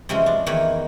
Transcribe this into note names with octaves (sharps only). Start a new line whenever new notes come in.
C3 E3 F3 G#3 C#4
D4
E2 D#3 A#3 E4 B4 C#5